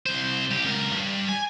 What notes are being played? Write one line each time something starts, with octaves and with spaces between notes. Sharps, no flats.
C2 C5
C2 G4
C#2 A#4
G2
G#5